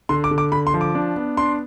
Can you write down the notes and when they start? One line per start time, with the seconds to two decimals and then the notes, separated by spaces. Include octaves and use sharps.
0.09 D3 C6
0.24 D6
0.31 D3
0.38 D6
0.52 D3 B5
0.67 C6
0.74 F3
0.81 D6
0.95 D4
1.16 B3
1.37 D4 C6